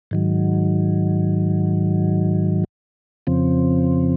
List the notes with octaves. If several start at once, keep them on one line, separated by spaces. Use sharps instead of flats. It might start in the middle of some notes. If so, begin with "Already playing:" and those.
G#2 D#3 F#3
F2 C#3 F3 C4